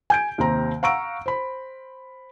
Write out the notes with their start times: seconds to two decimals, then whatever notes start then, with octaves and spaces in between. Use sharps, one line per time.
0.10 G#5 G6 D7
0.38 D#2 C3 C4 A#5
0.83 F5 F#5 A#5 C#6 E6 D7
1.26 C5 B5